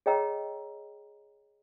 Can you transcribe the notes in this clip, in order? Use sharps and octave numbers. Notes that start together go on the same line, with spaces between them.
G#4 C#5 D#5 G5 A#5 E6